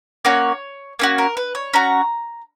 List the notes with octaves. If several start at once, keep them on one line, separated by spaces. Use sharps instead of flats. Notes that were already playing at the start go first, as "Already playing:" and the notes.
A#3 C#4 F#4 C#5
A#3 C#4 F#4
A#4
B4
C#5
C#4 F#4 A#5